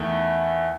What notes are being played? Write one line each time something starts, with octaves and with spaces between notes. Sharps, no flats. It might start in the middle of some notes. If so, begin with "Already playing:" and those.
Already playing: E2 D#3 A3